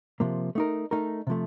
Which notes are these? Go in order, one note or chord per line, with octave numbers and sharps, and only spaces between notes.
C3 F3 A#3
A3 D#4 A#4
A3 D#4 A#4
C3 F3 A3